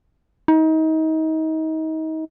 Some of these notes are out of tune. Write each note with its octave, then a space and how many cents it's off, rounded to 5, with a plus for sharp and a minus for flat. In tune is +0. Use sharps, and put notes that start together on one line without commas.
D#4 +30